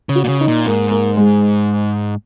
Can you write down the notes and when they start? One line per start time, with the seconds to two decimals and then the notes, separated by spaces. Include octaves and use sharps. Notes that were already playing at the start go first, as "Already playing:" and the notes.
0.09 C#3
0.15 F#4
0.24 A#2
0.28 C#3
0.41 D#4
0.48 A#2
0.66 G#2 A#3
0.91 A#3
1.17 G#3